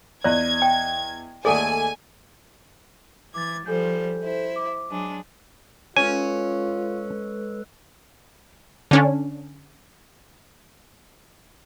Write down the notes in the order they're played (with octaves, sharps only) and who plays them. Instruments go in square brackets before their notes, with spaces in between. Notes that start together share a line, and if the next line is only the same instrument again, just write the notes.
[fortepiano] E2 D#5 F#6 [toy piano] D5 [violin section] G#6
[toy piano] G5
[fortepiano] D#2 A3 D5 [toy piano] G#4 A4 F#5 [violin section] G#5
[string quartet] E3 G#6 [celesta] D6 A6
[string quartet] F3 G3 C5 [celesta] A4 G#5 G6
[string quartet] E4 C5
[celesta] D6
[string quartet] F#3 G#3 D4
[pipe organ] G#3 A4 B4 [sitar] C#4 [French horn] F4 [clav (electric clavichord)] G#5
[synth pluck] D3 C#4 D4